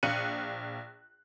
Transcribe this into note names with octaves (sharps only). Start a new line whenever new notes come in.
A#1 F5 F#6 C#7 D#7